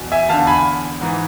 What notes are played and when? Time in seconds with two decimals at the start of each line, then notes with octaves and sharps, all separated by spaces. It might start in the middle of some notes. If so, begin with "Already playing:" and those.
Already playing: E2 B2
0.12 E5 G#5
0.29 E2 D3 F5 A5
0.47 G#5 B5
1.01 G#2 E3